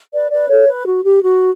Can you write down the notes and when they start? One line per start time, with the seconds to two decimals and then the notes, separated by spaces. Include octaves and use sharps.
0.13 B4 D5
0.31 B4 D5
0.49 A4 C#5
0.67 B4
0.85 F#4
1.04 G4
1.22 F#4